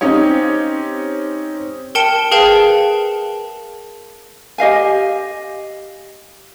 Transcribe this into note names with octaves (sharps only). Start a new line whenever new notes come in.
C4 C#4 D#4 G4 C#5
A#4 G5 A5 C#7 E7 G7
G#4 A#4 B4 F5 G5 A5
G4 D#5 F5 G#5